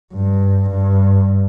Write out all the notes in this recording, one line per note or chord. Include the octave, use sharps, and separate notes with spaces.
G2
G2